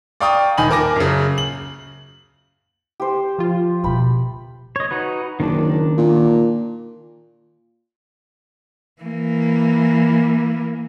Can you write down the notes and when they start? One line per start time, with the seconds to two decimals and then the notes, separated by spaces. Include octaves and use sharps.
0.20 D5 F5 G5 A#5 C#6 D#6
0.58 D#1 D#3 D#5 G#5 B5 F#7
0.70 A#4 A5 D6 A#6
0.96 F#2 C#3
1.38 F#7
3.00 G4 C5
3.39 F3 F4
3.84 B2 D#3 G5 B5
4.76 C#5 D#5
4.91 D#4 F#4 B4
5.40 F#1 D#3 D4
5.98 A#2
9.02 E3 A#3